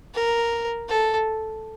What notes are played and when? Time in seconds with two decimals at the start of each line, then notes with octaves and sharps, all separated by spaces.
0.14 A#4
0.89 A4